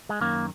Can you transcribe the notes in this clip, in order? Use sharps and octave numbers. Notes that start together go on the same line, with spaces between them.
G#3
F#2 D#3 A#3